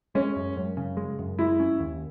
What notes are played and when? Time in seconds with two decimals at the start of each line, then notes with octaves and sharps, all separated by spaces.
0.15 G#3 C#4
0.36 F#2
0.57 F#2
0.77 C#3
0.97 G#3
1.19 F#2
1.39 G#3 E4
1.60 C#4
1.80 D#2